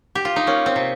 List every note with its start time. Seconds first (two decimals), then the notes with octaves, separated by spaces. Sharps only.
0.15 G4
0.25 F4
0.36 D#4
0.47 A#3 C#4
0.66 C4
0.76 C3